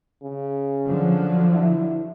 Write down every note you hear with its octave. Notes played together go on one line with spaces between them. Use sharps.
C#3
D3 F3 F#3
E4